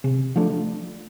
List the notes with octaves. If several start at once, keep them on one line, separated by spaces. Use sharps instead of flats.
C3
F3 A3 D4